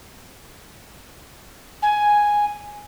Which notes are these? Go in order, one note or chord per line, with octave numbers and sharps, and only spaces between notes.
G#5